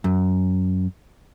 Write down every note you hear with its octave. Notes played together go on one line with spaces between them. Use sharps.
F#2